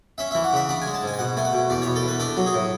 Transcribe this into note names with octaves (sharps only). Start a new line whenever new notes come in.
C#4 E5
E3 E5
F#5
C#3 E5
D4 F#5
G#3 G#5
A5
G#2 G#5
G#5
B2 F#5
A3 G#5
F#5
B2
E2 D5
B2 C#5
A4
E2 B4
D4 A4
F#3
G#4
A2